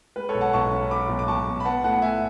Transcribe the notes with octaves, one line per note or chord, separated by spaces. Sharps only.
G#3 B4
A4 C#5
B1
F#5 A5
B1 A5 C#6
C#4
C#4 B5 D6
B1
D6
B1 A5 C#6
B2
B5
B3 F#5 A5
A2 F#5 A5
A2 E5 G#5